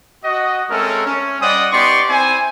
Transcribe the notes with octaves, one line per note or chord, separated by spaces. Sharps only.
F#4 D#5
G#3 A3 C4 C#4 A4 A#4
C#4
G3 C5 D5 D#5 F#5 D#6
B3 D#4 G4 D5 C6 C#6
C4 E4 C5 G#5